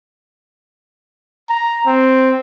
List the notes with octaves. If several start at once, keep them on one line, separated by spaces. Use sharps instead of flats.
A#5
C4